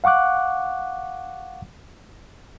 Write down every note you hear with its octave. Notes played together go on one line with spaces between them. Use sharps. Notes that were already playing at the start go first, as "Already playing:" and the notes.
F5 F#5 C#6 D6 F#6